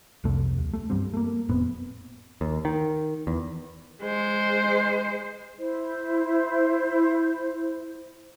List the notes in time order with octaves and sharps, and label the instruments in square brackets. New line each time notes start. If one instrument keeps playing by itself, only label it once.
[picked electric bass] C2 F2 C3 A3
D#2
A3
G2 F#3 G3 C4
A3 A#3
F1 A2 B3 C4
D#2
D#3
E2
[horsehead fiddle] G#3 C5
[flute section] E4 C5